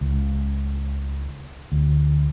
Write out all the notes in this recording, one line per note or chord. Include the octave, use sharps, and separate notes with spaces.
C#2
D2